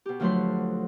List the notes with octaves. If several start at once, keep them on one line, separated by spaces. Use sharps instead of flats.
B2 G4
D2 F3 F#3 A3 B4 C6